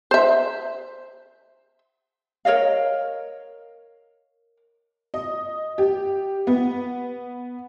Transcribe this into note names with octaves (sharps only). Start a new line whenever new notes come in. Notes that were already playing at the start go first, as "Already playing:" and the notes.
C5 E5
A#4 C#5 D#5 F5
D#5
G4
B3